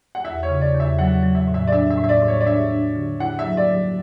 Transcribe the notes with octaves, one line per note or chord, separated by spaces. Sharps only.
F#5
E2 E5
C#5
C#3
D5
E2
E5
F#3 F#5
F#3
E5
A2
E5
D5
D4 E5
E5
A2
E5
D5
A2
C#5
D5
D4 E5
D4
D3
E4 F#5
E5
F#3
D5
F#3